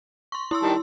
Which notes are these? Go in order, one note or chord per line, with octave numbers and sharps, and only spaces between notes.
C6 C#6
E4 C6 E6
D#3 G3 A5